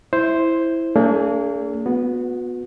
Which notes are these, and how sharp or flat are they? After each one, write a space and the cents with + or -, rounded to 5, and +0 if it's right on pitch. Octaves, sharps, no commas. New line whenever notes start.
E4 +0 C5 +0
A#3 -40 D4 -40 G#4 +0
B3 +0 F#4 -35